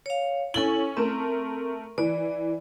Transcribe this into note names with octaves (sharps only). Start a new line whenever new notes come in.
C#5 F5
C#4 E4 A4 G#5 F#7
A3 C4 A#4
E3 D5